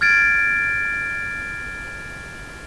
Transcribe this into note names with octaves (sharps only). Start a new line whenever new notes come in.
F6 G#6 A6 D7